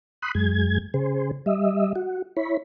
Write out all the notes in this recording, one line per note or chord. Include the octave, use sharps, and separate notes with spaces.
B5 C6 D#6 F#6
F#2 G#3 G#6
C#3 G#4 C5
G3 D#5 E5
F#4
E4 C#5 B5